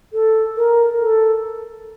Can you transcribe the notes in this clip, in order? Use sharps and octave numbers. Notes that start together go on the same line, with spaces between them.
A4
A#4
A4